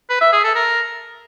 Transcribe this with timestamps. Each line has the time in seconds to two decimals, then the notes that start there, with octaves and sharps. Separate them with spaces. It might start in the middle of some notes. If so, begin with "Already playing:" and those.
0.10 B4
0.21 E5
0.32 G#4
0.44 A4
0.55 A#4